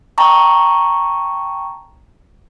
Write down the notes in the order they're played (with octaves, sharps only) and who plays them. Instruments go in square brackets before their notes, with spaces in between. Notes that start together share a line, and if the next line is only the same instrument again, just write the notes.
[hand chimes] G5 A5 A#5 C#6